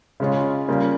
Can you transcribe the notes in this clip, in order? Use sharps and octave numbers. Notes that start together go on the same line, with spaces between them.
C#3 G#3 C#4 F4
C#3 G3 A#3 F4